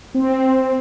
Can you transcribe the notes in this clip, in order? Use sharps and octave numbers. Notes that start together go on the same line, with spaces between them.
C4